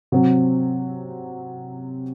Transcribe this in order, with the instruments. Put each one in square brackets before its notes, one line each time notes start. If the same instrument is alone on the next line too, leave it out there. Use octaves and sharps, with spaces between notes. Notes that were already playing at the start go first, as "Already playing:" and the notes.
[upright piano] C3 F#3 C4